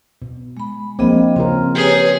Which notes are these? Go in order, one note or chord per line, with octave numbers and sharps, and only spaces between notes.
B2
G#3 B5
F3 A#3 C4 D4 G#4 D#5
C#3 C4 F4 A#4
G4 G#4 B4 C#5